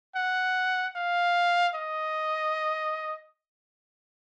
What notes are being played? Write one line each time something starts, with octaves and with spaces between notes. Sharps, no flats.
F#5
F5
D#5